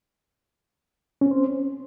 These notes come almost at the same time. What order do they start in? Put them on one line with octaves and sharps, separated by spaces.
C#4 C4 C5